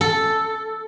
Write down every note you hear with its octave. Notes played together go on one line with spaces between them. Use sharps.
A4